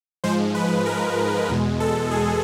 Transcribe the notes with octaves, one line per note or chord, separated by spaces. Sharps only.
G#2 F3 G#3 C5
B4
A#4
E2 B2 G#3
A4
G#4